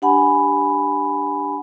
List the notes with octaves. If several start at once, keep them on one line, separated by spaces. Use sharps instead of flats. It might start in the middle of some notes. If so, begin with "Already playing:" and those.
D4 G4 F#5 G#5 B5